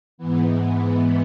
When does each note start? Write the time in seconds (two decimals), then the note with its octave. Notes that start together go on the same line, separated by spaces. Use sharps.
0.18 G#2 E3 B3